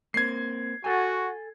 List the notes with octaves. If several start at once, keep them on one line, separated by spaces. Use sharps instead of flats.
A#3 C4 G#6 C7
F#4 A4 G#5